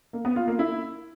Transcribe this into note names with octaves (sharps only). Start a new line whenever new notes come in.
A#3
B3
F4
A#3
E4